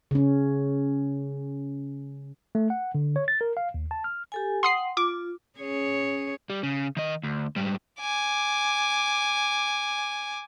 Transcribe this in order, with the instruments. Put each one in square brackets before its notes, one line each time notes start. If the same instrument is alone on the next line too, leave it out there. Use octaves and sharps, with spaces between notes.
[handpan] C#3 C#4
[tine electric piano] A3
F#5
D3
C#5
A6
A#4
F5
D#2
A5
F6
[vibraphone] G4 A4 G#5
[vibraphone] F#5 G5 [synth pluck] C6 D#6 C7
[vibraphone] F4 [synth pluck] D6
[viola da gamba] C#4 G#4 C#5
[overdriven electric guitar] G3
C#3
D#3 D#5
D2
G#2 G3
[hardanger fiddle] G#5 D6